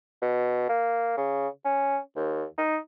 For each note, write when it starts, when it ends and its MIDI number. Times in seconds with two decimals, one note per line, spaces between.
0.22 0.65 47
0.69 1.13 58
1.17 1.48 49
1.65 1.98 61
2.16 2.44 39
2.58 2.77 63